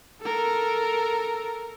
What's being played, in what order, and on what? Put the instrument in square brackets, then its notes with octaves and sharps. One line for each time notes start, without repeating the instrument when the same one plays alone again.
[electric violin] A4 A#4